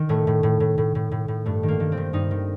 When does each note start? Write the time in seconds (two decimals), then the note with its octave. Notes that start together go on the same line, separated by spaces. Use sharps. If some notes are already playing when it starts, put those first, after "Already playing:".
Already playing: D#3
0.09 A2 A3
0.27 A2
0.43 A2
0.60 A2
0.78 A2
0.95 A2
1.11 A2
1.28 A2
1.46 G2 A3
1.63 D#3
1.68 A#3
1.80 D#3
1.92 C4
1.97 D#3
2.13 G2 D#4
2.31 D#3